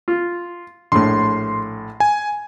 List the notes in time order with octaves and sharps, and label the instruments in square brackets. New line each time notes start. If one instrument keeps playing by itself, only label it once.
[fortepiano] F4
[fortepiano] A#1 A2 [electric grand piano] C6
[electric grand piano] G#5